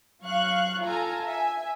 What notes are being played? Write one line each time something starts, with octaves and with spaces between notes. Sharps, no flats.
F#3 F5 C#6 F#6
F4 A4 G#5 A#5
E5 G#5